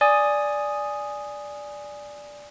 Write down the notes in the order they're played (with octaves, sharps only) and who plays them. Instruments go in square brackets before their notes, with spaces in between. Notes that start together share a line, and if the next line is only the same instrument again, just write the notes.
[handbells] D5 G#5 D#6